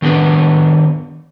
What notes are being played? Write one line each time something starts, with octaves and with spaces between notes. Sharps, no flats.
D#3 B3 D4 B4